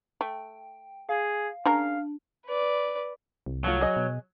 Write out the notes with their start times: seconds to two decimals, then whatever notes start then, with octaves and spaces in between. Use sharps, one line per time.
0.21 A3 G5
1.09 G#4 F5
1.65 C#3 D4 A#4 F5 A#5
2.46 B4 D5
3.46 C2
3.64 F3 F#3 A3 F4
3.81 G#4 D#5
3.96 B2